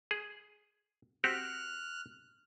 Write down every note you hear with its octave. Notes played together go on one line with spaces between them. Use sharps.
G#4
C4 F#4 G4 F6 F#6